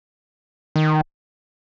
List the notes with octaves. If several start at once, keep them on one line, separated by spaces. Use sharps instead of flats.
D#3